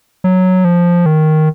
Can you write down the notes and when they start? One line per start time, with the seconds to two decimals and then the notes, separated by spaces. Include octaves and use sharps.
0.24 F#3
0.65 F3
1.06 D#3